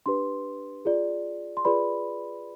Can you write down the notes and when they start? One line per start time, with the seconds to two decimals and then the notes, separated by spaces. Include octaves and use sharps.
0.06 D4 G4 B4 C6
0.85 F4 G#4 D5
1.57 C6
1.65 F4 G#4 B4 D5 B5